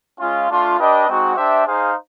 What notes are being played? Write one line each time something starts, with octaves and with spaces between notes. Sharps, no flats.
G#3 C#4 F4
A3 D4 F4
D4 G4 B4 D#5
G#3 C4 D#4 F#4
D4 G4 C5 E5
D#4 G#4 C5 F5